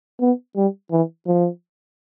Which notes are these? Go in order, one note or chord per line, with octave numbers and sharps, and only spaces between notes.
B3
G3
E3
F3